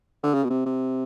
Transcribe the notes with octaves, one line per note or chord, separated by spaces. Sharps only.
D3
C#3
B2
C3
C3